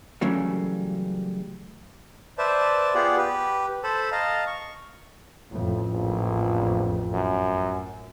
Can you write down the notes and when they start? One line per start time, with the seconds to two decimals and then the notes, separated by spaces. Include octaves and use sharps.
0.21 C#3 E3 F#3 G3 A3 A#3
2.38 B4 C5 D5 E5 A5
2.94 B3 F4 G4 G#4 D5 F#5
3.17 G4 B4
3.83 A4 C5 A5 B5
4.12 D#5 F5 A5 A#5
4.47 C#6
5.51 A1 F2 A2
5.91 A#1
7.13 F#2